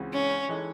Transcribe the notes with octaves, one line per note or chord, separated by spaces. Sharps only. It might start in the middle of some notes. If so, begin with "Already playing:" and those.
Already playing: C#2 C#3 E3 C4 F#4
C#4
E3 G#3 D#4 A4